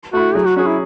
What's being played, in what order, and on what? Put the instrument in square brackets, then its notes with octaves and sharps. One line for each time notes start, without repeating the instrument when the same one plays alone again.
[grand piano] A3 E4 [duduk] F#4
[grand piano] F#3 [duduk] G#4
[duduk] F#4
[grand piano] C#4 G#4 [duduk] F#4
[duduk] E4